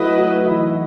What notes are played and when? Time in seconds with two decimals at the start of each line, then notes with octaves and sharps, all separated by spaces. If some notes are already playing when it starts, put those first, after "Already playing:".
Already playing: F#3 A3 E4 F#4 B4 D#5
0.17 F#3 F#4
0.41 D#4
0.46 E3 E4